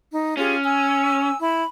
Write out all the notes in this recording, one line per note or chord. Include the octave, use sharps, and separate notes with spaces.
D#4
C#4 F4 G4 G#4
G#5 E6
E4 B5